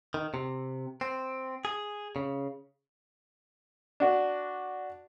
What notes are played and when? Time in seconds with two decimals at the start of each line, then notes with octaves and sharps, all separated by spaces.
0.14 D#3
0.34 C3
1.01 C4
1.65 G#4
2.16 C#3
4.00 D4 F#4